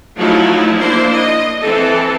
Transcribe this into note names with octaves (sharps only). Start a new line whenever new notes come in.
F3 F#3 A3 D#4 E4
A#3 D4 E4 C5
D#5
E3 C4 A4